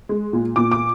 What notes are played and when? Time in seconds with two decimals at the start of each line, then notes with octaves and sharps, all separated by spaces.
0.09 G#3
0.33 A#2
0.56 A#2 D6
0.72 D6